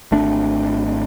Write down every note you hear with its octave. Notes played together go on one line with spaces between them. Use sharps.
G#1 A3 D4